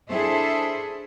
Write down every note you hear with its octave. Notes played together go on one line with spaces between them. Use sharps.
D4 E4 G#4 A4 C5 E5